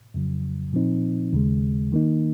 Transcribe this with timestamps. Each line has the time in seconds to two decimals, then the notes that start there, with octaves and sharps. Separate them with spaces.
0.14 F2 C#3 F#3
0.73 A#2 F3 C4 D#4
1.33 D#2 C#3 G#3
1.92 D#3 A#3 D#4